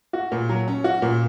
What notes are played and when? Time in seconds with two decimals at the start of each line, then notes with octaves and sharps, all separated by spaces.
0.13 F#4
0.32 A#2
0.49 F#3
0.68 C#4
0.84 F#4
1.02 A#2